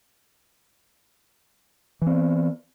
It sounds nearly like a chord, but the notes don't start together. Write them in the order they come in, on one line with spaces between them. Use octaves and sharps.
E3 C4 B3